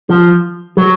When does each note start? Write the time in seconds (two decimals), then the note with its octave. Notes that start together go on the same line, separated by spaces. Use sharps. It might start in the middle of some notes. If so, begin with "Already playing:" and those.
0.09 F3
0.77 F#3